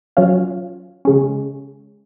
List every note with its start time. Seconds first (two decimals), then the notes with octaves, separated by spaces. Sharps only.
0.17 F#3 C#4 F4
1.05 C#3 G#3 C#4